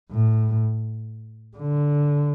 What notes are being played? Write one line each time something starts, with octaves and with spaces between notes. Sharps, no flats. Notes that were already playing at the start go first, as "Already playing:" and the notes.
A2
D3